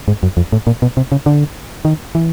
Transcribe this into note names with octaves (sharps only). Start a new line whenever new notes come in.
G#2
F#2
F2
A2
A#2
B2
C3
C#3
D3
D#3
E3